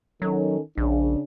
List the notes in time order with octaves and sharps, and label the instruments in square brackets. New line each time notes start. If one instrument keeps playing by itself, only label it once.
[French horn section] D#3 C#4 A4 [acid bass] F#3
[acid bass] A#1 [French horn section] C#3 D4